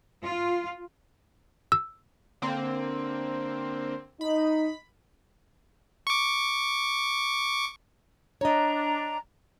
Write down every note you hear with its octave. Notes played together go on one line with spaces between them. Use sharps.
F4
E6
D3 A#3 C4
D#4 B5
C#6 D6
D4 C#5 D#5 A#5